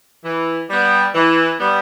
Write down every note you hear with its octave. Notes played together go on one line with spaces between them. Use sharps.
E3
G3 B3
E3
G3 B3